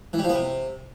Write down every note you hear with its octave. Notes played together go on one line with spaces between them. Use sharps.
E3
G3
F3
B3
C3